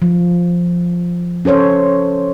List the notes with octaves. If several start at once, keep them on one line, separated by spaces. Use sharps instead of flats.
F3
C#4 A4 C5 C#5